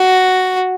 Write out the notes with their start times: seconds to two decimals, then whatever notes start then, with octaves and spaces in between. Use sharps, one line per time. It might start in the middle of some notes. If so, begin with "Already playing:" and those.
Already playing: F#4